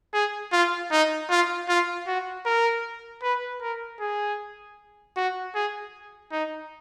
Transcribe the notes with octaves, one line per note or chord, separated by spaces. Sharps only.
G#4
F4
D#4
F4
F4
F#4
A#4
B4
A#4
G#4
F#4
G#4
D#4